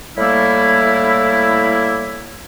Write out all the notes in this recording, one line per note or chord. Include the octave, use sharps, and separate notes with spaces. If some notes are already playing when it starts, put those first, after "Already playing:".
A2 G3 A3 A#3 E4